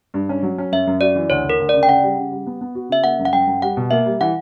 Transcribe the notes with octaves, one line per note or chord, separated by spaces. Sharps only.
G2
C#4
F#3
C#4
F#2 E5
F#2
F#4 D5
E3
D2 C#5
D2
A#4
D2
C#3 D5
G5
C#3 F#5
G3
C#3
G3
B3
B3
F#4
C#3 E5
A#3 F#5
F#2
F#5
F#2 G5
F#2
G3 F#5
B2
A#3 E5
G3
E3 F#5